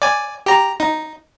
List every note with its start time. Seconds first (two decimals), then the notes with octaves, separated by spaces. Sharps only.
0.02 D5 G#5
0.46 G4 A#5
0.80 D#4